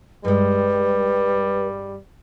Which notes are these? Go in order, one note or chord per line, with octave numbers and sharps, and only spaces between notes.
G2 G3 G#3 B4